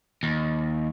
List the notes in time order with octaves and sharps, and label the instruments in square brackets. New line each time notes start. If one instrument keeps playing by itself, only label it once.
[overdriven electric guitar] D#2